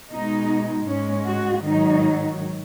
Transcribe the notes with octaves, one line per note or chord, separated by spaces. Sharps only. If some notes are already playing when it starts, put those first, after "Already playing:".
B2 G#3 D#4
G#2 G#3 C#4
F#4
G#2 D#3 F#3 D#4